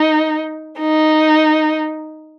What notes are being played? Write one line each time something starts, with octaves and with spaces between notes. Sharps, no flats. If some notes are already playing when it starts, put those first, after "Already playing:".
Already playing: D#4
D#4